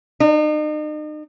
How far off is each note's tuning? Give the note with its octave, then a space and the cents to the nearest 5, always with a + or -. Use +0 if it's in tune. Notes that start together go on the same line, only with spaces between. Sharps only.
D#4 -40